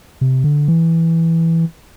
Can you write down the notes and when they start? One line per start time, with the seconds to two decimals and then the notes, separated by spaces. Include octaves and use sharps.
0.21 C3
0.44 D3
0.68 E3